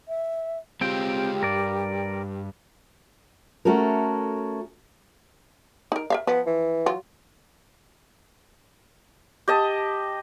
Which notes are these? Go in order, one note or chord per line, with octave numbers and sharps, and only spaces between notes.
E5
G#3 C4 F4 G4 G5
G2 A#4 D5
A3 C#4 F#4 A4 A#4
D#4 A#4
A#4 E5 F5
F3 B3
E3
F#3 F4
G4 D#5 A5